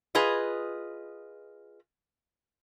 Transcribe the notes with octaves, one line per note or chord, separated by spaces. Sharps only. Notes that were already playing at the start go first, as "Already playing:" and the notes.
F4 G#4 B4 D#5